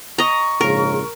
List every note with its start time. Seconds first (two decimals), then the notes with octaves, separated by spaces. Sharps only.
0.18 D#5 A#5 C#6
0.61 A#1 G#2 C#3 A#4